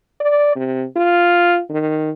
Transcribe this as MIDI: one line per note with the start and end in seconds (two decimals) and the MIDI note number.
0.21 0.54 74
0.56 0.85 48
0.96 1.61 65
1.70 2.11 51